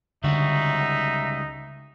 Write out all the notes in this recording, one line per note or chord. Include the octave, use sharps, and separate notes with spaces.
C#2 D3 G3 D#4 F#4 E5